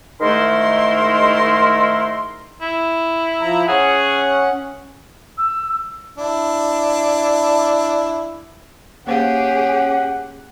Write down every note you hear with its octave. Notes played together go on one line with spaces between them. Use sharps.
G#2 D#3 A3 E4 A#4 C6
E4
F3 A#5
C#4 G#4 F#5
E6
D4 E4
A#3 C#4 G4 G#4 C5 F5 F#5